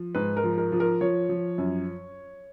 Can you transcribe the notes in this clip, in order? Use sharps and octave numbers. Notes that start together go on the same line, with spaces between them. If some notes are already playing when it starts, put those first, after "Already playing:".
Already playing: F3
G#2 B4
A#4
F3
A#4
F3
A#4
F3 C#5
F3
F#2